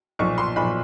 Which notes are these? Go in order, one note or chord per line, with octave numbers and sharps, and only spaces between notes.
B1 A#2 F3 C#6
C6
B1 A#2 F3 B5